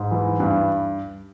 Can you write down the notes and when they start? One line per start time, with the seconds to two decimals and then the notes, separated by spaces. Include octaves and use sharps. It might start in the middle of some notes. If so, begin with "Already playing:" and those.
Already playing: G#2
0.11 E3
0.40 G2